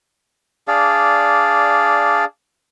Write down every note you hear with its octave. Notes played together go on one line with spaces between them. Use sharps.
D4 G#4 D5 F5